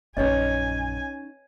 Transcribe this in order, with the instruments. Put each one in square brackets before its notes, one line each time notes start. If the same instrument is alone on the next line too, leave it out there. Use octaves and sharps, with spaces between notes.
[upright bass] A#1 F#2 [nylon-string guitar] C#4 D#4 [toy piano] B4 C#5 D#5 [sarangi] G#5